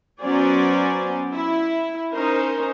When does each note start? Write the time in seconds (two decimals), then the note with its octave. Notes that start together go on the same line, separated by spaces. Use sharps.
0.22 F#3 B3 C#4 C5 D5 G#5
1.33 E4
2.13 C#4 D#4 A#4 C5